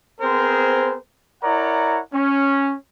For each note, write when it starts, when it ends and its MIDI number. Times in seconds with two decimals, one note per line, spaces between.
0.21 0.96 59
0.21 0.96 60
0.21 0.96 68
0.21 0.96 70
0.21 0.96 72
1.43 1.99 64
1.43 1.99 70
1.43 1.99 73
1.43 1.99 74
1.43 1.99 78
1.43 1.99 82
2.13 2.74 61